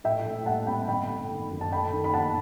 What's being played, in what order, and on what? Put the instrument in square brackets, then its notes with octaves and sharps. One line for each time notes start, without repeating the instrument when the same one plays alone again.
[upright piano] A2 E5 G5
A2
G3 F#5 A5
C4 G5 B5
G1 G5 B5
A3
D#3
F#2
A5
A3 G5 B5
D#3
B5
G1 F#5 A5